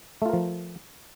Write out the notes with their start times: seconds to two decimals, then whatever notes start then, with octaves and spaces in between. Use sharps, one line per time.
0.22 A3
0.26 F4
0.29 A#4
0.33 F3